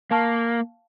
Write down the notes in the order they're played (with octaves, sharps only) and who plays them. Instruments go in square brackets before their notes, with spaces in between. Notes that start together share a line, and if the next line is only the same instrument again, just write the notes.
[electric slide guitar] A#3 [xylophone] F5 A5 C#6 F6